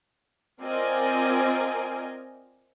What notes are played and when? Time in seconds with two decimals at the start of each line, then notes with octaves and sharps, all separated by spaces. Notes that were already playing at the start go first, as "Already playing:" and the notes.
0.61 C4 F4 A#4 D5 D#5 G#5